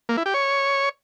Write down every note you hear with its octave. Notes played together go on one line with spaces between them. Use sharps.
A#3
E4
G4
C#5